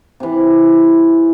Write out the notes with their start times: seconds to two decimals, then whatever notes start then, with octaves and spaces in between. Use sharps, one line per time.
0.20 C3 E3